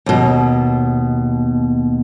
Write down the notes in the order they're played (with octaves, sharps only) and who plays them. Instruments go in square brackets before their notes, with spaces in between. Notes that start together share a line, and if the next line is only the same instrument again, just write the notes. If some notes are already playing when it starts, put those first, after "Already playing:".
[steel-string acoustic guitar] D#2 B2